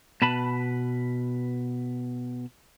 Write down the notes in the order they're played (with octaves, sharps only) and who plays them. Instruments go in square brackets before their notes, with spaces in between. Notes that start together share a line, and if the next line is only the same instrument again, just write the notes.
[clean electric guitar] B2 B4 A5 B5